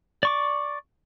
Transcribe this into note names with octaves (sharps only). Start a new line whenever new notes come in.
D5 C#6 D6